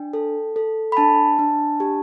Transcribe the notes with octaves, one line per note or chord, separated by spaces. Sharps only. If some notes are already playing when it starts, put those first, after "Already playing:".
Already playing: D4 G5
A4
A4
B5
D4 A5
D4
G4